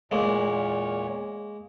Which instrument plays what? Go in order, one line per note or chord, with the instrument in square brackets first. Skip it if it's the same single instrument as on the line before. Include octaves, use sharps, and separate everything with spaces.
[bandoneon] E2 A#2 C#5 [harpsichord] G#3 A#3